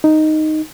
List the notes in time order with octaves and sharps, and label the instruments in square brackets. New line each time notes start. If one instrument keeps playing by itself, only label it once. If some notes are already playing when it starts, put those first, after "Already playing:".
[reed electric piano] D#4